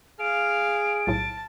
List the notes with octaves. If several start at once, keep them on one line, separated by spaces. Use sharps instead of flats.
G#4 F5 D7
B1 A2 A5